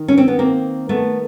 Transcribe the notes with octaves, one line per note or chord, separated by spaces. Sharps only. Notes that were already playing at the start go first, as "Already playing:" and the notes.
Already playing: D#3
C#4
C4
B3
A#3 C4
A3 B3